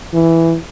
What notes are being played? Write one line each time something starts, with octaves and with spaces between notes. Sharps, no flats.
E3